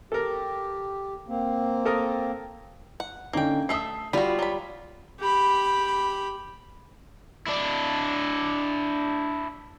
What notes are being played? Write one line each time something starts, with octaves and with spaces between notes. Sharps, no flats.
G4 A4 A#4
A#3 C4
A4 A#4 D#6
F#5
D3 A#3 C#4 D#4 G5
A3 A4 E5 D#6 C7
G3 F4 F#4 B5
F#3 B5
G4 B5
D4 E4